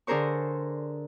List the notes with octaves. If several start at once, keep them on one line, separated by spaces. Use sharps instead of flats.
D3 D4 G#4 A#4 C5 C#6